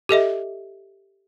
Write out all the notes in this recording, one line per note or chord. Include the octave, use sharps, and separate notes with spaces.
G4 A4 D#5 E5